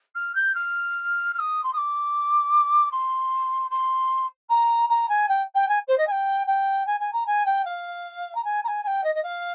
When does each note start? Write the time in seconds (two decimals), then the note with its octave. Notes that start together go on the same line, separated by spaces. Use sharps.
0.15 F6
0.35 G6
0.55 F6
1.34 F6
1.39 D#6
1.63 C6
1.73 D#6
1.77 D6
2.91 C6
3.70 C6
4.49 A#5
4.89 A#5
5.09 G#5
5.28 G5
5.55 G5
5.68 G#5
5.88 C5
5.97 D#5
6.07 G#5
6.11 G5
6.47 G5
6.86 G#5
7.00 G#5
7.13 A#5
7.26 G#5
7.46 G5
7.65 F5
8.35 A#5
8.44 G#5
8.64 A#5
8.67 G#5
8.83 G#5
8.87 G5
9.04 D#5
9.15 D#5
9.23 F5